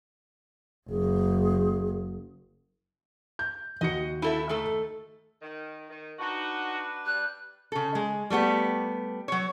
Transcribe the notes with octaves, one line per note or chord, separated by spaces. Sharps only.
F#1 G#4
G6
D#2 F#4 D#5 C#7
E4 A4 E5
D#3 A3 A4
D#3
D#3
D4 D#4 F#4 B4
G3 F#6
C#3 A4
G#3
G3 A3 B3 G4
F#3 C#5